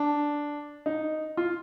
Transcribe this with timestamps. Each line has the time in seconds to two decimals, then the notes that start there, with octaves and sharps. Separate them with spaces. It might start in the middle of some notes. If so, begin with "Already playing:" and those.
Already playing: D4
0.86 D#4
1.37 F4